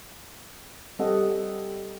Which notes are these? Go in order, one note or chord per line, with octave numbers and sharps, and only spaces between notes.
G3 C4 G4 A4 D#5 F#5